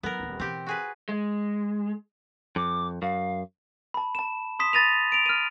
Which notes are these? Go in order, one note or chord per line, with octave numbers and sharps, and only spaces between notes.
F#3 B3 E4 A#4
D#1 C#2
B2 E3 C4 G4
F#4 G#4 B4
G#3
F2 D6
F#2 F5
A5 B5
A5 E7
C6 D#6 B6 E7
B5 A6 A#6 D#7 F7
D7 F7
F6 D#7